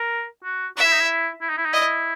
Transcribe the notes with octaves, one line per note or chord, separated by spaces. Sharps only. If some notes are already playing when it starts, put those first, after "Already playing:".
Already playing: A#4
F#4
F#4 E5
E4
D#4
E4
E4
D#4
E4
D#4
E4 D#5